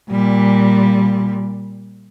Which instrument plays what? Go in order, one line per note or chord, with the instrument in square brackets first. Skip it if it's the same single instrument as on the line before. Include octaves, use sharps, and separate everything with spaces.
[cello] A#2 G3